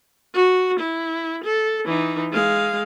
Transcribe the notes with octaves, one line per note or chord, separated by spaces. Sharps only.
F#4
E4
A4
E3 D#4
G#3 F5